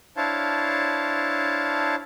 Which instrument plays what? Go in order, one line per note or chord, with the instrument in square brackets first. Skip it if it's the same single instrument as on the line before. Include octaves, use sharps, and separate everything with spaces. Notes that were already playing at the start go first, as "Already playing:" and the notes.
[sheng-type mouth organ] D4 E4 C5 C#5 F5 A5